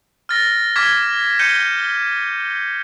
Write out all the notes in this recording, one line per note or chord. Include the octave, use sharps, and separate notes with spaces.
F6 A6 A#6
D6 F6 G#6 B6
G6 C#7 D#7 G7